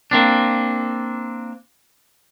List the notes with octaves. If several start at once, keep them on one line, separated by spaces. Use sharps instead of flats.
A#3 C4 D4